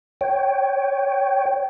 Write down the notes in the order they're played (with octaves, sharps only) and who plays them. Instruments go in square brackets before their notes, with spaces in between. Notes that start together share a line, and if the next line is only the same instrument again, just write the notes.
[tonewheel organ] C#5 G5